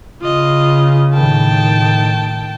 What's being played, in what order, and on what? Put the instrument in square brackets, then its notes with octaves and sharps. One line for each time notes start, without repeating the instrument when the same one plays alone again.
[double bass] C#3 [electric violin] F4 D#5
[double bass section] A2 D#3 [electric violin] G5 A5